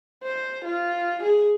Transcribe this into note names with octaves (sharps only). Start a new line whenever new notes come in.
C5
F4
G#4